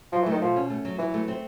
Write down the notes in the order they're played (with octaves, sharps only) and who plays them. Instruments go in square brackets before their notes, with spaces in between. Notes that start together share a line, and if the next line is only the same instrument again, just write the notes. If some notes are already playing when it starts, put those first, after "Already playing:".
[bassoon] F3 [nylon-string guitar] F#3
[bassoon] E3
[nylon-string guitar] A3
[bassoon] D#3
[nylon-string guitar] B2 [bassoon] F3
[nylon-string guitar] C#4
A3
F#3
[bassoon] E3 [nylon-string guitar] F#3
[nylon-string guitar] A3
C4